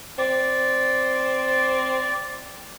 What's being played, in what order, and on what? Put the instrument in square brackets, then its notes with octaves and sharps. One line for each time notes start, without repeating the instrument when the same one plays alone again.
[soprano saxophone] C4 [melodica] D5